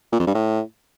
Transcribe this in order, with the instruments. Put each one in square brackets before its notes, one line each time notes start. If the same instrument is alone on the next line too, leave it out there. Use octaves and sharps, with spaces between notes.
[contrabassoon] A#2
F2
G2
A2